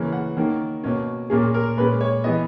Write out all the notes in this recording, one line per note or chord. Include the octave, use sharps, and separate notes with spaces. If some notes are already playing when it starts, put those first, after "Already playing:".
Already playing: C#3 E3 A#3 C#4
F#5
D#3 A#3 C#4
B2 A#3 C#4
A#2 A#3 C#4 G#4
A#4
A#2 G#3 C#4 B4
C#5
E3 B3 D#5